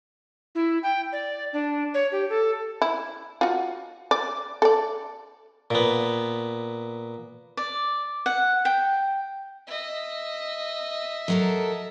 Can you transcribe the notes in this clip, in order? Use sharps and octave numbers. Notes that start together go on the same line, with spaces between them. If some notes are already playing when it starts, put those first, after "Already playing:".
E4
G5
D5
D4
C#5
G4
A4
E4
F4 F#4
D5
A4 D5
A#2 B3
D5
F#5
G5
D#5 E5
F#3 A4 A#4